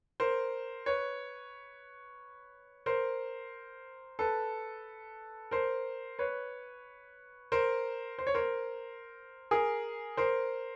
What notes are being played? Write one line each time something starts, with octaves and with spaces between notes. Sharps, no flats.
A#4 C5
B4 C#5
A#4 C5
A4 B4
A#4 C5
B4 C#5
A#4 C5
C5
C#5
A#4 C5
G#4 A#4
A#4 C5